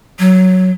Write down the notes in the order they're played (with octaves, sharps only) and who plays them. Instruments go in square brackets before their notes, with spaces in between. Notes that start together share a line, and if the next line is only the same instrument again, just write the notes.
[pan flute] F#3